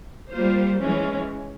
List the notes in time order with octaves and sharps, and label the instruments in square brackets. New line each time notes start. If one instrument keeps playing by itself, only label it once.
[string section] G3 A#3 F4 C5
E3 G#3 C#4